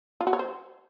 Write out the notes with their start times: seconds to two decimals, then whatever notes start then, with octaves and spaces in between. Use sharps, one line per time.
0.21 F4
0.27 F#4
0.33 C#5
0.39 C5